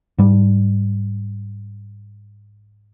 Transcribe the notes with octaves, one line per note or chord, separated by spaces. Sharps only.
G#2 G3